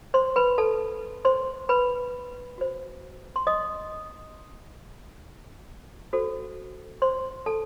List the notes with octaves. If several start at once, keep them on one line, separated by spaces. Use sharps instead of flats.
C5 C6
B4 B5
A4 A5
C5 C6
B4 B5
F#4 C5
C6
D#5 D#6
F#4 A4 C5
C5 C6
A4 A5